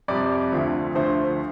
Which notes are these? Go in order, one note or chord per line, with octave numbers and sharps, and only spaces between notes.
F2 C3 G3 D5
D2 D3 F3 A3
D2 D3 F3 A3 C5